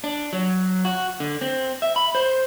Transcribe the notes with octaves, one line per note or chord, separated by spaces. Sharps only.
D4
F#3
F#4
D3
C4
E5
B5
C5